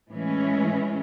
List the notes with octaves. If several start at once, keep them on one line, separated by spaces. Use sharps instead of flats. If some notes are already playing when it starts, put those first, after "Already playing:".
A2 E3 G#3 C#4